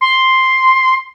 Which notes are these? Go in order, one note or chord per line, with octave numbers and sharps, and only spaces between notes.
C6